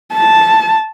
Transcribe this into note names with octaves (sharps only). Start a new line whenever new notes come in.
A5